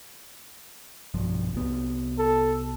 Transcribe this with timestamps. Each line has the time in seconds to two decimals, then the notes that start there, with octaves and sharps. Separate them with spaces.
1.14 B1 G2 F3
1.54 C2 B3
2.19 A4